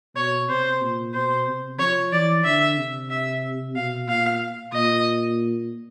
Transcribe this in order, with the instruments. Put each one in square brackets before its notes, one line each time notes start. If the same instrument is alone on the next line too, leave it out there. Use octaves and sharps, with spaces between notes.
[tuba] B2 [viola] C#5
[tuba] C3 [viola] C5
[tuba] A#2
[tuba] B2 [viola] C5
[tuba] C3
[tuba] F3 [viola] C#5
[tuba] E3 [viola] D5
[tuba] D3 [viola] E5
[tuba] C3
[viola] E5
[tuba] B2 [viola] F5
[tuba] A#2 [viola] F5
[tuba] A#2 [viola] D#5